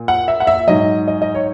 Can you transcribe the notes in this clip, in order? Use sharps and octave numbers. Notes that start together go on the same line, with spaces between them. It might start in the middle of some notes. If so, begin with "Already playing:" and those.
Already playing: A#2
F#5
E5
F#5
E5
G#2 F#3 D#5
D#5
D#5
C#5